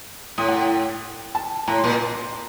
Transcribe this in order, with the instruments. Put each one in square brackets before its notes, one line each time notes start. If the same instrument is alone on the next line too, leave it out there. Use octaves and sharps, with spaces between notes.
[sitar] A2 [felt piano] D#6
[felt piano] F#5
G5
A5
[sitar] A2 [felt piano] A#5
[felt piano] C6
[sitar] A#2